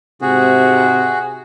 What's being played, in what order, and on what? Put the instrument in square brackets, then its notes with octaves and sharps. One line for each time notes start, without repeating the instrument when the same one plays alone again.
[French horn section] G#2 C3 [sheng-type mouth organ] F#4 G#4